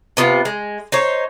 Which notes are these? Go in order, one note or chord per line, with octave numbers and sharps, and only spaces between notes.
C3 B3 F4 F#5
G#3
D#4 C5 C#5